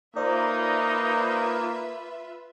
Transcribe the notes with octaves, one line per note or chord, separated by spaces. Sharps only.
A#3 D#4 F4 B4 C5 D5 E5